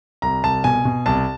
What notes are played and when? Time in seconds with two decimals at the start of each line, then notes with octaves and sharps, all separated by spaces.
0.22 C2 A#5
0.44 C2 A5
0.64 B2 G#5
0.85 B2
1.06 C2 A5